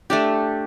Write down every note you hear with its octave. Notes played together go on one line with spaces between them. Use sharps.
A3 D4 G4